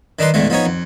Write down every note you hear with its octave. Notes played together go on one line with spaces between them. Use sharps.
D#3 D4 D#4 B4 C6
A1 E2 D3 G#3 A3
F3 B3 D#4 C#5
F2